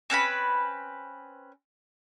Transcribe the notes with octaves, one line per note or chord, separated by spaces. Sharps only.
C4 C#4 B4 B5